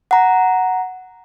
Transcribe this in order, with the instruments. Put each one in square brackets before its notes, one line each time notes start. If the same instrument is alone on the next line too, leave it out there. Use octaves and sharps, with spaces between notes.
[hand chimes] F#5 A#5